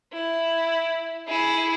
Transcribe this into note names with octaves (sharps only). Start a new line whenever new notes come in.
E4
E4 G#4